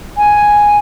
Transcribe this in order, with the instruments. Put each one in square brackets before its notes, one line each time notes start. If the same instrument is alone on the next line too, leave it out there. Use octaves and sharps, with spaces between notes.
[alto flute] G#5